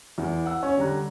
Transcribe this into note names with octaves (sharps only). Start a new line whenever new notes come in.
E2
F#5 E6
C#4
D3 G3 A#5 F#6